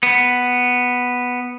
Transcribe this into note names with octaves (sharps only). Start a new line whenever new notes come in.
B3